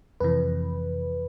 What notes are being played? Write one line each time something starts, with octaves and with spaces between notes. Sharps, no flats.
F2 C3 E3 B4